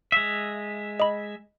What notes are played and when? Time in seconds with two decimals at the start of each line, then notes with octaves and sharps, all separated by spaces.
0.12 G#3 E5
1.00 D#5 B5